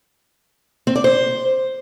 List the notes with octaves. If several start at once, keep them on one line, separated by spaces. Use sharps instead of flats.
C4
D5
C5